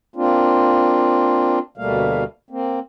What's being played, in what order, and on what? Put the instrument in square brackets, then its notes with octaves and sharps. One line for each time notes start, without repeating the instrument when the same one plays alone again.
[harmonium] A#3 C4 D4 F4
D2 B2 G3 A3 A#3 F5
A#3 C4